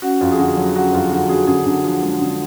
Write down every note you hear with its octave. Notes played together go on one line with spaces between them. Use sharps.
C#4 F#4
F2 F4
G#4
D3 F#4
F#3
C#4 F#4
F2 F4
D3 F#4
F#3 G#4
D3 G#4
D3
F3
G#3
D3